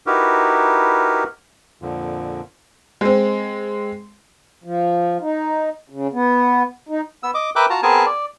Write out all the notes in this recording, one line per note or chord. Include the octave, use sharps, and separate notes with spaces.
D#4 E4 F#4 G4 A#4 B4
F2 A#2 D3 F3
G#3 C4
F3
D#4
C#3
B3
D#4
B3 E6
D#5 D6
A#4 B4 E5 G5 D6 F#6
F4 F#4 A5 A#5
B3 C4 G#4 A#4 G#5 A5
D5